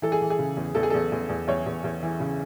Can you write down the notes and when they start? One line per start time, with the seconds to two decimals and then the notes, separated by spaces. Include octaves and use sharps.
0.02 E3 A4
0.12 G#4
0.21 E3
0.30 G#4
0.39 C#3
0.57 E2
0.75 E2 A4
0.83 G#4
0.90 E2 A4
1.12 E2
1.29 E2
1.47 E2 C#5
1.66 E2
1.84 E2
2.02 E3
2.20 C#3